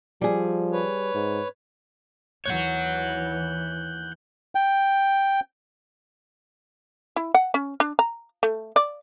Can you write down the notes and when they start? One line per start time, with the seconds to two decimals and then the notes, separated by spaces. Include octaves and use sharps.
0.21 F3 G3 G#4
0.72 B4 C#5
1.14 G#2
2.45 D#2 E3 C#5 F#5 F#6 G6
4.55 G5
7.16 E4
7.34 F#5
7.54 C#4
7.80 D4
7.99 A#5
8.43 A3
8.76 D5